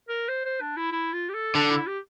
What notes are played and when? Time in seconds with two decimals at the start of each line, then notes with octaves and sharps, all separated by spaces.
0.09 A#4
0.29 C5
0.45 C5
0.61 D4
0.77 E4
0.92 E4
1.13 F4
1.29 G4
1.35 A4
1.55 D3 D4
1.70 E4
1.87 G4